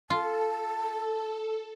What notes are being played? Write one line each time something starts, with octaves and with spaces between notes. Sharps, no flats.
F4 A4 A5